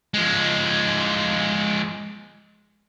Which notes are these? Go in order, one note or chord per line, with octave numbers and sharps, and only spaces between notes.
F3 G#3